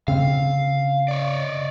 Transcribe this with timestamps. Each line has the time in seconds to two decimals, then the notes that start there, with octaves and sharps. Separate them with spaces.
0.08 C#3 C4 F5
1.08 C#5 D5